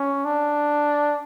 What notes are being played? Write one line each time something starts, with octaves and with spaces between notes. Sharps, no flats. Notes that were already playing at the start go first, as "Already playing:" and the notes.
Already playing: C#4
D4